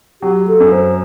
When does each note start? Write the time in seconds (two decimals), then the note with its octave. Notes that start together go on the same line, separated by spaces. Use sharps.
0.22 F#3 G4
0.48 A4
0.60 F#2
0.72 C5